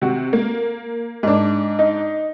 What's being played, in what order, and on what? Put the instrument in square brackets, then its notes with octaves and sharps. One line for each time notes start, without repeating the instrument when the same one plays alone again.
[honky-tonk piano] C3 F#4
A#3
[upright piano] G#2 D4
[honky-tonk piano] D#4